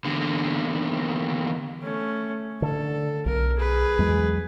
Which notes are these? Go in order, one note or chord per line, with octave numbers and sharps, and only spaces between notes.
E2 D3
A3 C#4
D3 A4
B1 A#4
G#4 B4
E2 F#3 G#3